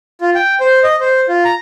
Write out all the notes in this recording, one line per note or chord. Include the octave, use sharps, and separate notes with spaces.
F4
G5
C5
D#5
C5
F4
A#5